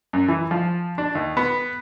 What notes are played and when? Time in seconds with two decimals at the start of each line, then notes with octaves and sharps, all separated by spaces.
0.13 F#2
0.28 E3
0.51 F3
0.98 D4
1.15 D#2
1.37 B3